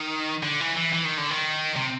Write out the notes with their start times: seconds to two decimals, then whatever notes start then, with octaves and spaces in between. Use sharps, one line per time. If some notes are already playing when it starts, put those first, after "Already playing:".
Already playing: D#3
0.43 D3
0.60 E3
0.77 E3
0.93 E3
1.05 D#3
1.17 D3
1.30 D#3
1.76 C3